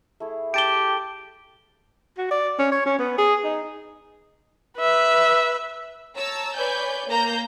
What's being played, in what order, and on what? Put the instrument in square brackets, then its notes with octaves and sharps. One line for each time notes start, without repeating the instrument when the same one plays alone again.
[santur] A3 E4 G#4
[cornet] G4 [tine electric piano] G5 A5 D6 [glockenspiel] D7 G7
[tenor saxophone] F#4
D5
C#4
C#5
C#4
B3
G#4
D#4
[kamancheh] B4 E5
[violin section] C#5 A5 A#5 E6
B4 C#5 D5 G#5 G6
A#3 A#5 G6